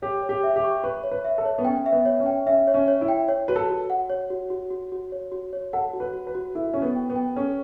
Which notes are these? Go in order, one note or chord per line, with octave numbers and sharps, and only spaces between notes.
G4 C#5
C#5
G4
E5
G4
C#6
B4 C#6
C#5
B4
E5
A4
C#5
B3
C#4 G5
E5
B3
C#5
C#4
G5
C#4 E5
C#5
C#4
C#5
E4
G5
C#5
F#4 B4
A4
F#4
F#5
C#5
F#4
F#4
F#4
F#4
C#5
F#4
C#5
A4 F#5
F#4
B4
F#4
B4
F#4
E4 A4
C#4 A4
B3
G5
B3
G5
C#4 A4